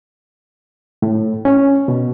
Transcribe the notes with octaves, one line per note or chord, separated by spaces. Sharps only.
A2
C#4
B2